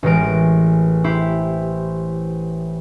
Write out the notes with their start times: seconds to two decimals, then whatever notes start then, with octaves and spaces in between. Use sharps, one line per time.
0.03 A1 E3 G#3 A#4 D7
1.04 E4 G4 C5